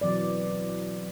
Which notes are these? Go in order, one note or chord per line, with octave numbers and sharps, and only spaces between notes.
B2 E3 F#3 C4 D5